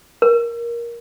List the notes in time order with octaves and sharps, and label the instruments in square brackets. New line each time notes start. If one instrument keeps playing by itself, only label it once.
[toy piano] A#4